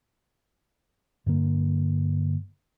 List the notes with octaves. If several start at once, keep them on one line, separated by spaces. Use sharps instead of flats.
G2 D3 A#3